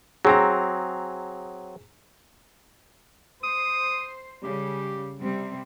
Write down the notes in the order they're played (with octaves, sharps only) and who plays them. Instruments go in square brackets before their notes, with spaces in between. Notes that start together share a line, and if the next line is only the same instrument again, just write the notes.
[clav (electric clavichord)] F#3 C4 [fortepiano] G#4 A#5
[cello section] C5 [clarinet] D#6
[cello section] C#3 G3 [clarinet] G4
[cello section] C3 G3 C4